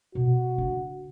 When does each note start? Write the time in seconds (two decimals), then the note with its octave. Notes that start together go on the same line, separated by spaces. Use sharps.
0.15 B2 F#4
0.58 C#3 D4